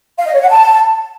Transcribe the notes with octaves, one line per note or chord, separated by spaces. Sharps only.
F5
D#5
C#5
F#5
A5